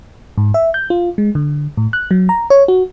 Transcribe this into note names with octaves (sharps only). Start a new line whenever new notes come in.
G#2
E5
G6
F4
G#3
D3
A2
F#6
F#3
A#5
C#5
F#4